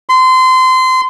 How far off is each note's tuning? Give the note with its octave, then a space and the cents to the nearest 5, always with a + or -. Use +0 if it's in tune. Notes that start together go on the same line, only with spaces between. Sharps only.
C6 -25